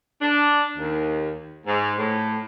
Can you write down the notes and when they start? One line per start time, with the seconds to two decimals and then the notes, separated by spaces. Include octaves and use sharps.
0.22 D4
0.78 D#2
1.67 G#2
1.98 A2